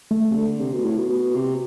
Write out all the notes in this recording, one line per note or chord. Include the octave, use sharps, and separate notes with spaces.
A3
C3
D3
C3
B2
A2
B2
B2
C3